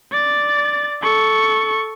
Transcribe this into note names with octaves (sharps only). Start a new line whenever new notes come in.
D5 A6
A4 C#6